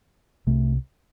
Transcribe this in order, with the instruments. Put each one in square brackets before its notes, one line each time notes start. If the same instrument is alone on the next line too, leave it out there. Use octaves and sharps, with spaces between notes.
[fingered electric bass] C2 C3 A3